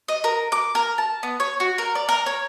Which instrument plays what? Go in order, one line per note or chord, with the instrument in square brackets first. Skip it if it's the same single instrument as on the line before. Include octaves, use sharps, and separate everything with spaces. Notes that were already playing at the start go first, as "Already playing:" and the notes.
[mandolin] D#5
A#4
D6
A#4
A5
B3
C#5
F#4
A#4
D5
A#4
C#5